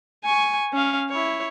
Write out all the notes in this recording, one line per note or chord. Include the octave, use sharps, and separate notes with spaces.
G#5 C#6
C#4 F5
E4 C#5